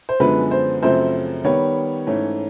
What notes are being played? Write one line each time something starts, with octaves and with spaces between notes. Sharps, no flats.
C5
F#2 D3 F3 G#3 B3 B4
C5
F#2 C#3 F3 A3 C4 C5
D#3 G3 B3 C#5
G#2 E3 A3 C#4